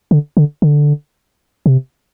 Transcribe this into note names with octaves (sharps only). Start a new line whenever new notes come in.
D3
D3
D3
C3